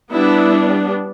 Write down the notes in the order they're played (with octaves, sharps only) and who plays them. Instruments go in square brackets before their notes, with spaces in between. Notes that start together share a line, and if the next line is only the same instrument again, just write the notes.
[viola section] G3 B3 D4 E4